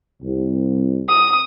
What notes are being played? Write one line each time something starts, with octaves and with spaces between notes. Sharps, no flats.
C2
D#6